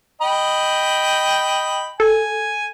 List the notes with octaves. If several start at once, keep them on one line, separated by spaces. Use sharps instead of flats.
D#5 G5 B5
A4 G#5